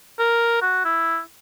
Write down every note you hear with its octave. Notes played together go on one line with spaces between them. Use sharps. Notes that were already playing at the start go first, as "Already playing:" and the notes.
A#4
F#4
E4